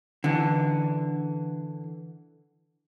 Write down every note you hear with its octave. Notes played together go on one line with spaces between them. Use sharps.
D3 E3